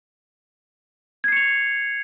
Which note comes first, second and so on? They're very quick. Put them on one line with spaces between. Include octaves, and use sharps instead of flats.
G#6 C7 C#7 F7